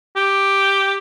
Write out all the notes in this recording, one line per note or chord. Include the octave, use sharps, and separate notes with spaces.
G4